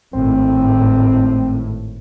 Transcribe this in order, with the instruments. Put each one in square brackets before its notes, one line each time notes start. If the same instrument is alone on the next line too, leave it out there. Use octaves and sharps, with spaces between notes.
[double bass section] G#1 A2 [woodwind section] C4